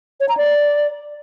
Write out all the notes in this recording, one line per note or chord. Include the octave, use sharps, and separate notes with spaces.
C#5
A#5
D5